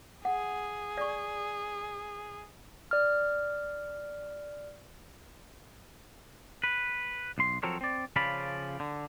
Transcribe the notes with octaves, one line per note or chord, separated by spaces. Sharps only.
G#4 F#5
D5 C#6
D5 F6
B4
B1 C6
F3 F#3 C4 A4 A#4 C#5
C4 D5
C#3 F3 C#4 D5 F5 B5
D3